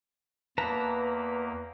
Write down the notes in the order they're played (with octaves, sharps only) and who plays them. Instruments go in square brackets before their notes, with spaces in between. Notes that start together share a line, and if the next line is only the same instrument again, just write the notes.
[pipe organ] E2 A#3 [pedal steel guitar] B4 A5 A#5